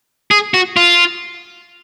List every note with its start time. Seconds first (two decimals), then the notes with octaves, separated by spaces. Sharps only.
0.31 G#4
0.54 F#4
0.77 F4